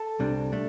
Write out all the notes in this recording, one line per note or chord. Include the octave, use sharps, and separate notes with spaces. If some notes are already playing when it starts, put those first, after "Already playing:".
Already playing: A4 A5
C2 C3 G3 D4
A3 D4